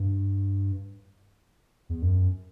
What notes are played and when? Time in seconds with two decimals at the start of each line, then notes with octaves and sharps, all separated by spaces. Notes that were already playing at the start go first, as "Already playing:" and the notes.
Already playing: G2
1.89 E2
2.02 F#2